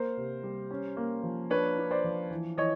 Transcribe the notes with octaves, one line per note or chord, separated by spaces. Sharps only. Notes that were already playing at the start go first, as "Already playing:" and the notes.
Already playing: A#3 A#4 C5
C3
G3
C#4
A#3
F3
D4 B4 C#5
D4
C5 D5
F3
E3
E3 C#5 D#5